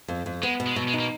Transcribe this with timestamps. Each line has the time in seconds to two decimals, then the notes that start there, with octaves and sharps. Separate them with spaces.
0.08 F2
0.26 F2
0.42 G#3 B3
0.60 B2
0.66 G#3
0.76 B2 F#3
0.88 G#3
0.93 D#4
0.99 A#3